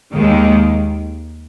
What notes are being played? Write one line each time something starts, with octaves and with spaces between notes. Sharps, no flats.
D#2 D#3 G#3